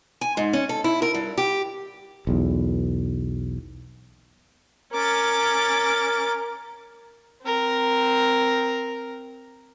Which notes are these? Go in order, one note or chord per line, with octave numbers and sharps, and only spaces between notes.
G#5
G#2
C#4
A4
E4
A#4
G2
G4
B1 E2
C#4 A#4 D6 A6
C4 A#4